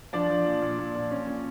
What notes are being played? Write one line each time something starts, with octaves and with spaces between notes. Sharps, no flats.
F3 D4 D5
F3
A#2
A#2
A#2
A#2
C#4
A#2